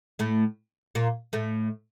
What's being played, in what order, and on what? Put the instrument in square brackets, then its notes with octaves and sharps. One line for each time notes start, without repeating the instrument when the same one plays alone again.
[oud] A2 A3
A#2 A#3
A2 A3